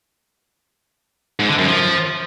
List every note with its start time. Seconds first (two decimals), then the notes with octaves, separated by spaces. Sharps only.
1.40 G#2
1.49 D3
1.58 F#2
1.68 F3